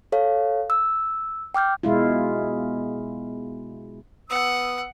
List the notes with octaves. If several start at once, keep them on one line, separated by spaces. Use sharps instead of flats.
A4 C#5 F5
E6
G5 D6 F6 G6
B2 G#3 E4 F4
B3 F#5 D#6 E6